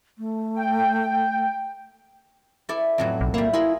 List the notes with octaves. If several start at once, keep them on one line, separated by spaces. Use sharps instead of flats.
A3
G5
E4 A4 D5
F2 A2 F#3
B1
G3 A#3 E4
E4 F4 G#4 A#4